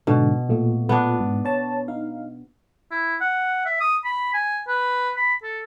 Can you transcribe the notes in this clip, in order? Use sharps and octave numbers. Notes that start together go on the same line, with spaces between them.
G#2 B2 D3
A#2 A3 F4
B3 D4
G#2
C#5 A5
D#4 F5
E4
F#5
E5
D#6
B5
G#5
B4
B5
A4